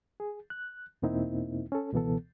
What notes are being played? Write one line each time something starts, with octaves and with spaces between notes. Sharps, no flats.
G#4
F#6
E2 B2 A#3 C4 D#4 E4
C#4 A4
C#2 B2 E3 B3 A4